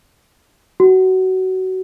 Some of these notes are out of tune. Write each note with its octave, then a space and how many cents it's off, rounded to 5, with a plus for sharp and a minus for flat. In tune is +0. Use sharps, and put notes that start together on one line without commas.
F#4 +20